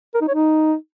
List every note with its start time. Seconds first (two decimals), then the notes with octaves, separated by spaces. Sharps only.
0.15 A#4
0.21 D#4
0.28 C#5
0.34 D#4